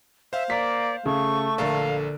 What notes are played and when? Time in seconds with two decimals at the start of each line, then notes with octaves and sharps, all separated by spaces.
0.33 C5 E5 F5
0.50 A#3 D5 B6
1.06 C#3 A3 C#6
1.58 A#1 D3 A4 A#4 F5